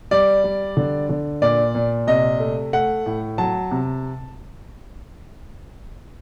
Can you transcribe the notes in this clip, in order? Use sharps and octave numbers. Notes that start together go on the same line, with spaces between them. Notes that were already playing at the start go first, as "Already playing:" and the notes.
G3 D5
G3
D3
D3
A#2 D5
A#2
C3 D#5
A3
A3 F#5
A2
F#3 A5
C3